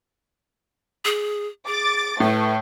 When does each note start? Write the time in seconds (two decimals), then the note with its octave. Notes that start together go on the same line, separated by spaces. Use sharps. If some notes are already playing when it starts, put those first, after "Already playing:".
1.05 G#4
1.67 G#4 D6 A6
2.20 A2 A3 B4